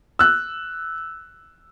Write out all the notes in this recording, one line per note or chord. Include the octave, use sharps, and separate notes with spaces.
E6 F#6